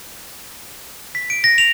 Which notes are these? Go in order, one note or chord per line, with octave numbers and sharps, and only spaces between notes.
B6
D7
A#6
F7